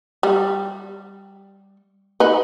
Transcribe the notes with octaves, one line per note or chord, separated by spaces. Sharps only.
G3
D#4 B4